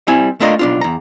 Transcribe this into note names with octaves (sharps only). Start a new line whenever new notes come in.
G3 C4 E4 G#5
A3 A#3 D4 F4 A#4 D#5
B1 D4 F4
E2 A#5